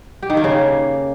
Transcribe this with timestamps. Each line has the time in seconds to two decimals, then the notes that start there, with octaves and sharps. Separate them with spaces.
0.23 G4
0.30 D#3
0.37 A#3
0.44 C#3